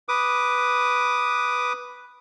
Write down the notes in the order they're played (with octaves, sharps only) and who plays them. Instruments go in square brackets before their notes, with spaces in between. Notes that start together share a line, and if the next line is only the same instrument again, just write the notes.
[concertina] B4 D6 D#6